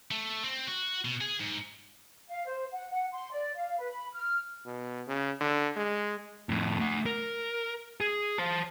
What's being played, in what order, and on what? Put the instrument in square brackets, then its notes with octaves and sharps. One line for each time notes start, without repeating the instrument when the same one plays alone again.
[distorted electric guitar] A3
C4
F#4
B2
G#4
G#2
[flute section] F5
C5
F#5
F#5
C6
D5
F5
B4
B5
F6
[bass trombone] B2
C#3
D3
G#3
[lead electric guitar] F2 A2
A3 F#5
A#4
G#4
C5 A5